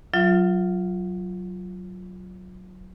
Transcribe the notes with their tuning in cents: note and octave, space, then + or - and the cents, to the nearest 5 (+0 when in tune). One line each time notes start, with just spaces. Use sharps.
F#3 +0 F4 +0 E5 +45